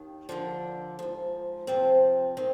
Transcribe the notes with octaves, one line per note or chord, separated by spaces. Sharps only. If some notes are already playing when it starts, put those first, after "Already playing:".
Already playing: D#2 D#3
D#2 D3 F3 D4
G#2 F3
F2 C3 F3 C4
D#3 C4